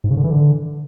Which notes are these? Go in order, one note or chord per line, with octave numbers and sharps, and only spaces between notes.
G#2
C#3
D3
E3
D3